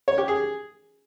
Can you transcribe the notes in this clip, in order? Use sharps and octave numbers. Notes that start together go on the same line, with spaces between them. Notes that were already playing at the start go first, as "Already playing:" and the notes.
C#5
G4
G#4